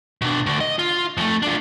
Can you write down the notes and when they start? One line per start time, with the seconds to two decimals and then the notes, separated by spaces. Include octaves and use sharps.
0.22 B2 D4
0.46 D2 D3
0.61 D#5
0.79 F4
1.17 F2 A3
1.42 D4 F4